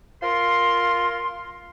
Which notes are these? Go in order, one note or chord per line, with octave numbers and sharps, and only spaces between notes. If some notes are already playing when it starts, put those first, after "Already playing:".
F4 A#4 F5 C6